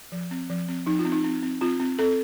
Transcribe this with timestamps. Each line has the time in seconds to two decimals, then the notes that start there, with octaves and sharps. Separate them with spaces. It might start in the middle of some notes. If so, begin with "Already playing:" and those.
0.12 F3
0.31 C4
0.50 F3
0.68 C4
0.87 F3 D#4
0.99 F4
1.05 C4
1.12 D#4
1.24 C4
1.43 C4
1.61 C4 F4
1.80 C4
1.99 C4 A4